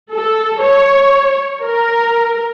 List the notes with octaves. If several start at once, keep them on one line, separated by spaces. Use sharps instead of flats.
A4
C#5
A#4